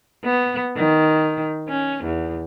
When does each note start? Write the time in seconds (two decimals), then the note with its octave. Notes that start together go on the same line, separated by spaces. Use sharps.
0.24 B3
0.77 D#3
1.68 C#4
2.05 E2